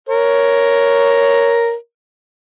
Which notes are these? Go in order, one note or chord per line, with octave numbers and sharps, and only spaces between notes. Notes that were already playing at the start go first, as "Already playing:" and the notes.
A#4 C#5